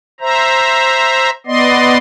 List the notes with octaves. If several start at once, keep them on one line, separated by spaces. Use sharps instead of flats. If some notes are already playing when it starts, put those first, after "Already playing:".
C5 E5 A#5
B3 D5 D#5 C6